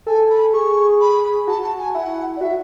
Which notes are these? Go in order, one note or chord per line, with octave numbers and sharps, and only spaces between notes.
A4 G#5
B5
G#4 C#6
B5
F#4 A5
A5
G#5
E4 F#5
D5
F#4 E5